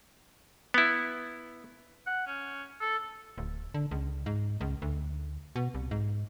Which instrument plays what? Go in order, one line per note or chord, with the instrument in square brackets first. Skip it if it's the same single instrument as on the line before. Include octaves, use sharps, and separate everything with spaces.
[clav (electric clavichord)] B3 E4
[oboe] F#5
C#4
A4
[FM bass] D1
D3
C#2
G#2
C#2
D2
B2
C2
G#2